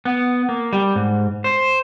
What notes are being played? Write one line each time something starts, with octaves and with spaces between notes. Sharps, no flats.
B3
A#3
G3
G#2
C5